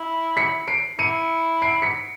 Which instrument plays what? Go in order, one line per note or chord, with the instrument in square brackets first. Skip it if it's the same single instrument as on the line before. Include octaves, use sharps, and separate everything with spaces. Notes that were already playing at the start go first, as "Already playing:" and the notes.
Already playing: [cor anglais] E4
[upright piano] B6 C#7
C7 D7
[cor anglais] E4 [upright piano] C#7 D#7
[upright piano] C7 D7
B6 C#7